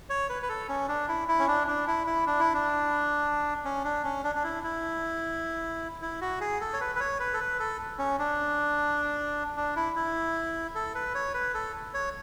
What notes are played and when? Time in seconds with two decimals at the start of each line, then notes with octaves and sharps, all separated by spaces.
0.10 C#5
0.29 B4
0.42 B4
0.49 A4
0.69 C#4
0.88 D4
1.09 E4
1.28 E4
1.39 C#4
1.48 D4
1.67 D4
1.87 E4
2.07 E4
2.27 D4
2.40 E4
2.54 D4
3.65 C#4
3.84 D4
4.04 C#4
4.24 D4
4.35 D4
4.44 E4
4.64 E4
6.02 E4
6.21 F#4
6.41 G#4
6.61 A4
6.73 C#5
6.81 B4
6.95 B4
7.00 C#5
7.20 B4
7.33 A4
7.40 B4
7.60 A4
7.99 C#4
8.19 D4
9.57 D4
9.76 E4
9.96 E4
10.75 A4
10.95 B4
11.15 C#5
11.34 B4
11.54 A4
11.94 C#5